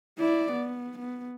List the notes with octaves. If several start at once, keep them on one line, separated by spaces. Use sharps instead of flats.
E4 D5
B3
B3